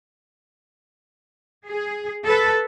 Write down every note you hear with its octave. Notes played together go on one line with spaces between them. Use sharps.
G#4
A4 B4